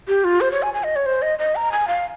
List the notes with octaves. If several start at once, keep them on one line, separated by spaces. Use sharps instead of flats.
G4
F4
C5
C#5
G#5
G#5
D#5
C#5
C5
D#5
D#5
A#5
G#5
F5